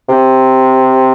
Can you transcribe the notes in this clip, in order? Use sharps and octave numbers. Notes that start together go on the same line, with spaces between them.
C3